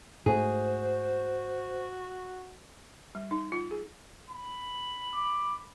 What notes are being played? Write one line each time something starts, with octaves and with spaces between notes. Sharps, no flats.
G#2 A3 F#4 G#4 C5
G3
D#4
F4
G#4
B5
D6